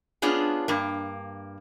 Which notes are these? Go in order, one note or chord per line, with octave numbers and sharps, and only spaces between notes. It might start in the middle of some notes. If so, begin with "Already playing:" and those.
B3 C#4 D4 F4 G#4
G2 A#3